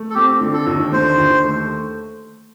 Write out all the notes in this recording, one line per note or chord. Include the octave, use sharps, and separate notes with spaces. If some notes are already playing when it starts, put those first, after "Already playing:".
Already playing: A3
A4
C4 G4
D3
A4
D#2
D3 C5
D#2
A3